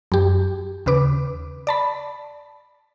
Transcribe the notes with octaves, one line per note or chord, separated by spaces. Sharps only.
F#2 G4
D#2 C#3 B4 D6
D5 A5 B5